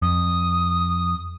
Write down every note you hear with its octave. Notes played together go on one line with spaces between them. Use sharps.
F2 D#6